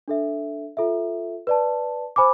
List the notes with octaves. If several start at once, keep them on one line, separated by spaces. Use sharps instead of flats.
D4 A4 E5
F4 A4 E5
B4 D5 A5
C5 G#5 B5 D6